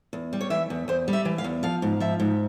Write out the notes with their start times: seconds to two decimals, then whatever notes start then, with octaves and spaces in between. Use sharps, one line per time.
0.13 E2
0.33 G3
0.41 C#5
0.50 E3 E5
0.70 E2
0.88 E2 C5
1.08 G3
1.13 E5
1.25 E3
1.38 F5
1.44 E2
1.63 F3 F5
1.82 G#2
2.00 F3 E5
2.20 G#2